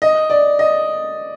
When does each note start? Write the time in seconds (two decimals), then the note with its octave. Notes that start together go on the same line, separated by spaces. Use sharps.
0.02 D#5
0.30 D5
0.59 D#5